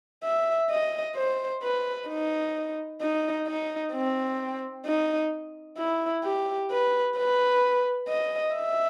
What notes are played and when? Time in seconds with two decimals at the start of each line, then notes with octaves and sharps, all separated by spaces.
0.23 E5
0.70 D#5
1.16 C5
1.62 B4
2.08 D#4
3.01 D#4
3.47 D#4
3.92 C4
4.86 D#4
5.78 E4
6.24 G4
6.70 B4
7.16 B4
8.09 D#5
8.55 E5